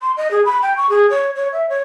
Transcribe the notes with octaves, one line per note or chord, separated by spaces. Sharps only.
C6
D#5
G#4
B5
G5
C#6
G#4
C#5
C#5
E5
C#5